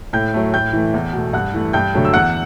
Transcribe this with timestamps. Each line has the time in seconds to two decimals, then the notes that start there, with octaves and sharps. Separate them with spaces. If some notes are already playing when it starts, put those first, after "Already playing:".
0.13 A2 G5 G6
0.34 F#3 A3
0.54 A2 G5 G6
0.73 E3 A3
0.94 E2
1.13 B2 A3
1.33 G2 F#5 F#6
1.54 E3 A3
1.73 G2 G5 G6
1.94 D3 F#3 A3
2.05 E6
2.14 E2 F#5 F#6